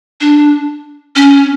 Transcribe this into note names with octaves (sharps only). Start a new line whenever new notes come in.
D4
C#4